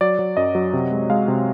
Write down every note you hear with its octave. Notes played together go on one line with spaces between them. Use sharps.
F#3 D5
F#3
F#2 D#5
F#3
C3
G#3
G#3 F5
C3